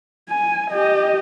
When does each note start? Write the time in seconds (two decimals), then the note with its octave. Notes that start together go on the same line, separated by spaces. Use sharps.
0.30 G#5
0.70 G4 D#5